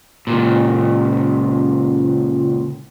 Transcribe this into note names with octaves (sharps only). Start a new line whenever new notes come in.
C#2 A#2